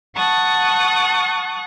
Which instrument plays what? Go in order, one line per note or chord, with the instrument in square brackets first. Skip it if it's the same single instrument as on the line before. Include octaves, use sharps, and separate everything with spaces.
[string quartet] F#5 A5 C#6 D#6 F#6